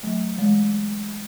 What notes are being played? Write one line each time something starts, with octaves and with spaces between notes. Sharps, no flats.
F#3 A3
E3 G#3